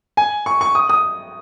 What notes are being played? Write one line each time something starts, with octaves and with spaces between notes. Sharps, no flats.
G#5
C#6
C#6
D#6
D#6